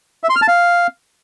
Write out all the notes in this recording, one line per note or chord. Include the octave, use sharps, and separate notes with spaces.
E5
C6
F6
A5
F5